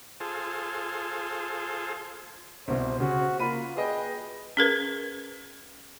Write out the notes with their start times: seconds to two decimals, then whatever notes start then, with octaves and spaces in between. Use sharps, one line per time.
0.20 F4 G#4 A4 C5
2.68 C2 B2 C5
3.00 C#3 F#4
3.40 A#3 F4 B5 D#7
3.77 G#4 B4 D#5 G5
4.57 C#4 G#4 A#4 B4